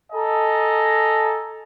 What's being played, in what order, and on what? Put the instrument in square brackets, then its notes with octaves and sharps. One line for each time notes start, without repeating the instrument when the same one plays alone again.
[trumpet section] A4 D#5 G#5 A#5